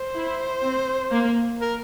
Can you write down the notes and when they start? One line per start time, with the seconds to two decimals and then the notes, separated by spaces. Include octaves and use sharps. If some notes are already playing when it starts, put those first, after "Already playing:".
Already playing: C5
0.15 E4
0.63 C4
1.12 A#3
1.61 A#4